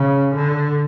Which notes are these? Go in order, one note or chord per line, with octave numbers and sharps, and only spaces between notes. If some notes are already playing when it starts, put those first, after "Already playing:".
Already playing: C#3
D3